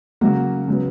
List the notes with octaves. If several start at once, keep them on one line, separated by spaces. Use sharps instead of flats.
C#3 F#3 A#3 F#4
C#3 F#3 B3